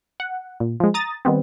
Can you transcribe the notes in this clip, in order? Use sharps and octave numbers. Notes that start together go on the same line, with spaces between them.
F#5
A#2
F3 G#3
A#5 D#6 A6
D#3 G3 B3 C4